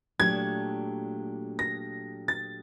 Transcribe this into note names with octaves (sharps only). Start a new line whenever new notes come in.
A#2 F#3 A3 D4 G4 G#6
A#6
A6